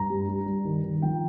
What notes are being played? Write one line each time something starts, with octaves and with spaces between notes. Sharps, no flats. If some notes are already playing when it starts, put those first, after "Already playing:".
Already playing: G2 A#5
G3
G3
G3
D#3
D#3
F3 G5